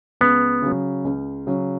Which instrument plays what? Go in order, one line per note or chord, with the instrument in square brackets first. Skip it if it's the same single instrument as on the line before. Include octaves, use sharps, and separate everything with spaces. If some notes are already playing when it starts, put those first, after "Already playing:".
[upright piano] C#2 [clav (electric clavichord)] B3
[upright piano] C#3 F#3
C#2
C#3 F#3